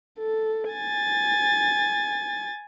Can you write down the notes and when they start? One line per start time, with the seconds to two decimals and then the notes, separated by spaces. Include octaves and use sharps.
0.20 A4
0.72 G#5 A6